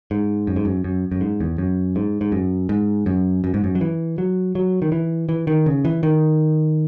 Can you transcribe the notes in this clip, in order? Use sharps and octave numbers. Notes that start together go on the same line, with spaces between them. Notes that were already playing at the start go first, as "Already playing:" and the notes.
G#2
F#2
G#2
F#2
F#2
F#2
G#2
E2
F#2
G#2
G#2
F#2
G#2
F#2
F#2
G#2
F#2
F#3
E3
F#3
F#3
D#3
E3
E3
D#3
C#3
E3
D#3